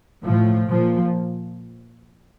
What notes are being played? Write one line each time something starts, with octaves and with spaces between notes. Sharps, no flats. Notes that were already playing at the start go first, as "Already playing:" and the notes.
A2 F3
A#2 F3